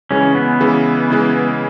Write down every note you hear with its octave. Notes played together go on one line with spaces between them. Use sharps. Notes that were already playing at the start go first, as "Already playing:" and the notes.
C#3 E3 G#3 C#4
B3
C#3 E3 G#3
C#3 E3 G#3